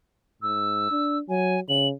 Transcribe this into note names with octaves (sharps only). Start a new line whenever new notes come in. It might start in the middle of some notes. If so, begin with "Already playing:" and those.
G#2 E6
D4
F#3 G#5
C#3 F#7